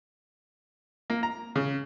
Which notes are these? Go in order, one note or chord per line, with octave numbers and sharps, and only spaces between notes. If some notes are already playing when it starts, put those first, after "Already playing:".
A#3
A#5
C#3